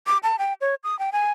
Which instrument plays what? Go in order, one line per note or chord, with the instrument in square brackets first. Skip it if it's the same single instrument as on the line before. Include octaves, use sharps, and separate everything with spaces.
[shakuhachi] D6
A5
G5
C#5
D#6
G5
G#5